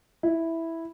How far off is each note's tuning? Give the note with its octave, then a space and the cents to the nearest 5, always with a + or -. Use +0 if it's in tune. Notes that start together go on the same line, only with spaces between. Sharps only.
E4 -5